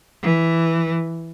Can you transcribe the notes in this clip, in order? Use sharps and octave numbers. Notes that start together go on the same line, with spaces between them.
E3